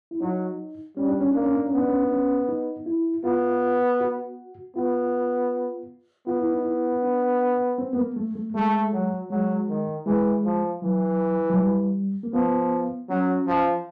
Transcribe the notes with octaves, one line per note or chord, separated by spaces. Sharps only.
E4
F#3 D#4
G3 C#4
D4
C#4
A#3 D4
C#4
D4
C#4
B3
D4
C#4
D4
C#4
D#4
E4
B3 F4
F#4
B3 F4
B3 F4
E4
D#4
E4
D4
C4
B3
A#3
A3
A3
G#3 A3
F#3
F#3 G#3
D#3
E3 G#3
F3
E3 F#3
F#3
G3
A#3
F3 B3
F#3 C#4
F3